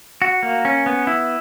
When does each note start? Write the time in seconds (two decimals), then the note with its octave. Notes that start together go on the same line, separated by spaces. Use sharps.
0.22 F#4
0.43 A#3
0.65 C#4
0.86 B3
1.07 E4